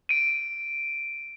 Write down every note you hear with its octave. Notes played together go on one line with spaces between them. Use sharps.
D7 D#7